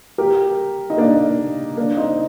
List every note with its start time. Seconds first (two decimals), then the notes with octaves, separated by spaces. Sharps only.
0.18 G4 A#4
0.90 D#4
0.98 A#3 D4
1.77 A#3 D4
1.97 C4 D#4